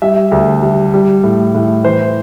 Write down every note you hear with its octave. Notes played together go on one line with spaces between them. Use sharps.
G3 E5
D2
G3
G3
A2
A2
E3 C5